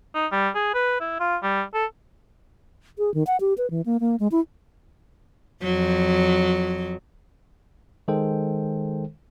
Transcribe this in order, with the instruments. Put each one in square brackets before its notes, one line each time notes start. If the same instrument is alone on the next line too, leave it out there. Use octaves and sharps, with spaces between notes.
[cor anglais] D#4
G3
G#4
B4
E4
F4
G3
A4
[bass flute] G#4
D#3
F#5
G4
B4
E3
A#3
A#3
G#3
E4
[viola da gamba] F2 F#3
[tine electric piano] D#3 G#3 A4 C5 G5